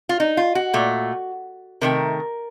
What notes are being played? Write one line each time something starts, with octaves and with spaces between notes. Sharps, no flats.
F4
D#4
F4
F#4
A#2 A3
C3 D#3 A3 A#4